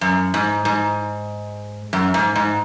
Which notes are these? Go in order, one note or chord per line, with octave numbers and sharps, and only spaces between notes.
F#2
G#2
G#2
F#2
G#2
G#2